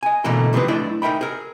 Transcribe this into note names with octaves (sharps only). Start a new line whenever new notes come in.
D#5 G#5
B2 D3 E3 A3 A#3 A#4
C3 E3 F3 C4 G#4 B4
A3 D4 E4 D5 D#5
D#4 A#4 E5 G5 B5
G#4 A#4